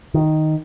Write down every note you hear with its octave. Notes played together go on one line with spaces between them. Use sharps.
D#3